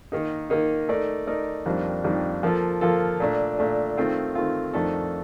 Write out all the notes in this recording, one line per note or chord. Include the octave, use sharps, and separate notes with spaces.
D#3 A#3 D#4
D#3 A#3 D#4
A3 D#4 A#4 D5
A3 D#4 A#4 D5
F2 D#3 G3 A#3 D4
F2 D#3 G3 A#3 D4
F3 A#3 F4 A4
F3 A#3 F4 A4
A#2 A3 D4
A#2 A3 D4
D#3 A3 C4 F4
D#3 A3 C4 F4
F2 D#3 A3 D4 A4